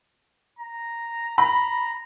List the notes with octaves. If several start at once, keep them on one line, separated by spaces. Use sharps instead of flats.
A#5
A#5 B5